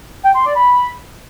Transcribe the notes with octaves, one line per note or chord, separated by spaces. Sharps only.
G5
C6
D5
B5